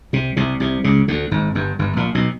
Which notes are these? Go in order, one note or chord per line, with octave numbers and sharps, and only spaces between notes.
C2 C3
C2 C3
C2 C3
C#2 C#3
D2 D3
G#1 G#2
G1 G2
G1 G2
A#1 A#2
B1 B2